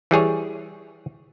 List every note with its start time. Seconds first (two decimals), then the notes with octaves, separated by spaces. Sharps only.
0.11 E3 G3 G#4 C#5